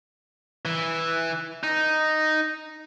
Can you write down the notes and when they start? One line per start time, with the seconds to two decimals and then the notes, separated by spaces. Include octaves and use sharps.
0.65 E3
1.63 D#4